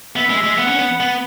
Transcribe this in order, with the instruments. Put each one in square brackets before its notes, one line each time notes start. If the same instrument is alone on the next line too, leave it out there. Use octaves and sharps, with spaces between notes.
[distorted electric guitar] B3 [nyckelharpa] E5
[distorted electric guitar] G#3
G#3
[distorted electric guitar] B3 [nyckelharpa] F#5
[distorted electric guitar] C#4
B3
B3